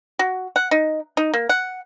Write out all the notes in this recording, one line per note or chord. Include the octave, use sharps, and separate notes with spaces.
F#4
F#5
D#4
D#4
A#3
F#5